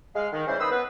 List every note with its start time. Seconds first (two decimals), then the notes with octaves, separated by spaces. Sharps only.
0.16 G#3 F5
0.33 D#3
0.47 C#3 E3 G3 C#4 C5
0.60 D#3 B4 B5 C6 D#6 E6
0.71 B3 B4